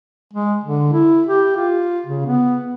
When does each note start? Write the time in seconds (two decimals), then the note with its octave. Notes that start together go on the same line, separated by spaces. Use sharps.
0.34 G#3
0.64 D3
0.93 E4
1.27 G4
1.57 F4
2.06 C#3
2.26 B3